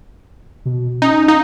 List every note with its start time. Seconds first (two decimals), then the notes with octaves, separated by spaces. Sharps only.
0.65 B2
1.02 C#4 D#4
1.28 D#4 F5